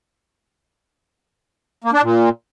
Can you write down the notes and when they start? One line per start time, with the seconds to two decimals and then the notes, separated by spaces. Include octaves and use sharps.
1.84 A#3
1.93 D4
2.03 A#2